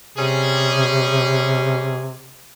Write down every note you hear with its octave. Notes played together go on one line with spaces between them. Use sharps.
C3 G3 C#4 G#4